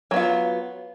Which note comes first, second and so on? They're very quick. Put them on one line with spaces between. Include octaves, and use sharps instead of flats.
F#3 B3 F4